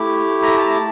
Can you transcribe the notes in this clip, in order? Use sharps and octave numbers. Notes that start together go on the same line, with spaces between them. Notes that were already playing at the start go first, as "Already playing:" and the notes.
Already playing: A3 E4 G4
A#5
A5